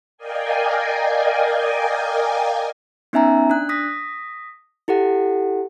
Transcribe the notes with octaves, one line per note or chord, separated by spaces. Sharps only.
A#4 D5 D#5 F5 G5 G#5
B3 C#4 D#4 E5 G#5 A#5
D4 F#6
D#6 A#6 B6
E4 G4 A4 F#5